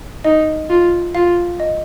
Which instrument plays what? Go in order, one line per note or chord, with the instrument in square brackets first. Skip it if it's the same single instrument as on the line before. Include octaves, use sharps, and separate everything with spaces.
[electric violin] D#4 [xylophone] D#5
[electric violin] F4
[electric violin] F4 [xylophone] F5
[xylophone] D#5